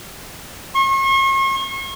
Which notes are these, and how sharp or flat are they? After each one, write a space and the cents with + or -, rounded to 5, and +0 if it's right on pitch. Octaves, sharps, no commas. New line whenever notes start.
C#6 -40